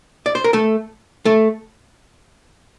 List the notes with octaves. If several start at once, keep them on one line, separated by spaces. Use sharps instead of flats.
D5
C5
A#4
A3 A4
A3 A4